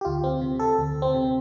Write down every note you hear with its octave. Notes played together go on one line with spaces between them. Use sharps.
G4
D2 F4
C4
C3
A4
D2
C4
C3